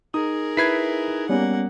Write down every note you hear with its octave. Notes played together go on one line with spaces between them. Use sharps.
D#4 G#4 A#4 D#6
E4 B4 G#6 B6 C7
G3 A#3 B3 C#4 F#5